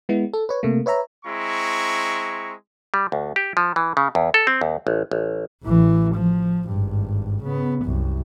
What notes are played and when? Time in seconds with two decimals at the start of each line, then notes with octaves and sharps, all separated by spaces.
0.09 G#3 B3 E4
0.34 A4
0.49 B4 C#5
0.63 C3 A3 A#3
0.86 B4 C#5 E5 A#5
1.25 G#3 C4 E4 A#5 C#6
2.94 G3
3.12 D2
3.36 G4
3.57 F3
3.76 E3
3.97 C#3
4.15 E2
4.34 A4
4.47 C4
4.61 D#2
4.87 A1
5.11 A1
5.64 A1 E3
6.15 F3
6.69 G#1 G2
7.43 C#3 B3
7.83 C2 F#2